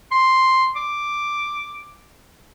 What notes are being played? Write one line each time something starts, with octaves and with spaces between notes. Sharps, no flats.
C6
D6